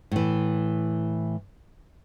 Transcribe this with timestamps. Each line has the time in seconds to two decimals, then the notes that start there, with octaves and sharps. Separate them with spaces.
0.11 A2 E3